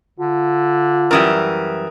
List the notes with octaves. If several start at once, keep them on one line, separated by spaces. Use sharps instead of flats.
D3 F4
F#2 E3 G3 A#4 D#6